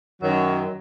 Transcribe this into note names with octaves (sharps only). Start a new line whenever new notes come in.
F#2 D#3 F#3